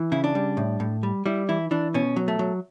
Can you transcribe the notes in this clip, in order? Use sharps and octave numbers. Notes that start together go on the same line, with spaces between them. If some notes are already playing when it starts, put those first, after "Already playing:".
Already playing: E3
C#3 E4
D4
G3
A2
A2
G3
G3 E4
E3 E4
E3 D4
B2 C#4
F#3
A3
F#3